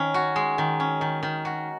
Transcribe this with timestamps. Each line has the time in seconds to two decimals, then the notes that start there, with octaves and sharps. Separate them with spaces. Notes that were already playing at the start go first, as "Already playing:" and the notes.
Already playing: D#3 C#4
0.14 F#4
0.36 G#3
0.58 D#3
0.80 C#4
1.01 D#3
1.23 D#3
1.45 F#4